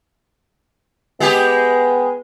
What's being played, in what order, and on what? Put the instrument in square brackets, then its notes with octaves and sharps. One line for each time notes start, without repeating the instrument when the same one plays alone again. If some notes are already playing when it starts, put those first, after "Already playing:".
[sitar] G#3 G4 G#4 [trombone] B3